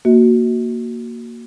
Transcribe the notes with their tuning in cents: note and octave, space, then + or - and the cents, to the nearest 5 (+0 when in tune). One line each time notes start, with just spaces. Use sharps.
A#3 +0 F#4 +0 E5 -45